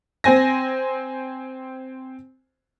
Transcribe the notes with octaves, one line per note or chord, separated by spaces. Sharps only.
C4 C5 G#5 A#6